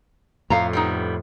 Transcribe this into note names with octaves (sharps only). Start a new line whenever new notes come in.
F2 A2 F5 A#5
G3 B3 D#4